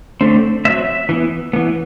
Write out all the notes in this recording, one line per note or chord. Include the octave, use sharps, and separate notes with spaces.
D3 A3 C4
F#3 C4 E5
E3 B3
E3 B3